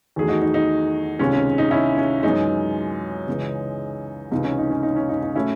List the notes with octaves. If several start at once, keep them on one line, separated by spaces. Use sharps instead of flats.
E2 D#3 F#3 A3 G#4
D#4 F#4
D#4
D#4
C#2 C3 D#3 G#3 C#4
C#4
D#4
C#4 E4
C#4
F#2 E3 G#3 D#4
C#2 C#3 E3 G#3
C#2 C3 E3 D#4
C#4
D#4
C#4
D#4
C#4
D#4
D#4
A2 F#3 A3 C#4 E4